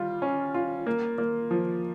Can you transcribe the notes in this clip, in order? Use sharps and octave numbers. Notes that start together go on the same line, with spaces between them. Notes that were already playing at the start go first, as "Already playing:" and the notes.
Already playing: G3 F4
C#4
F4
A#3
A#3
F3